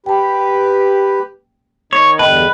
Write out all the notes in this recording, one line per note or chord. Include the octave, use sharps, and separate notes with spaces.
G4 B4 G5 A5
D#3 D#4 C#5
E2 G2 D3 B4 D#5 G5 A5